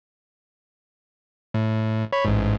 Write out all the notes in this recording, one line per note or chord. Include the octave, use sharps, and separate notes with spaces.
A2
C#5 B5
A1 G#2